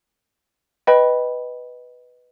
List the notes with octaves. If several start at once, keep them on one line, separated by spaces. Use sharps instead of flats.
B4 D#5 G5 B5